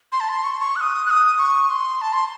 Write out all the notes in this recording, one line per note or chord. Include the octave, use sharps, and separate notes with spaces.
C6
A5
C6
C#6
C6
C#6
F#6
D#6
F#6
D#6
C#6
C6
A5
C6